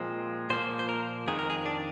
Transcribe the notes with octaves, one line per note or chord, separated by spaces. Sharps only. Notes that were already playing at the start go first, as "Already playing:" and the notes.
Already playing: A#2 F3 G#3 C4
A#2 F3 A#3 C5
C5
A#4
F2 D#3 G#3 G#4
A#4
G#4
D4